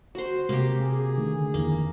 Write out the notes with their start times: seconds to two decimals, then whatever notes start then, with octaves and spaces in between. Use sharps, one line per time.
0.15 F#4 C5
0.49 C3 G#3 A#3 G4
0.81 G#4
1.18 D3 D#3 A3
1.54 F2 D#3 E3 A#3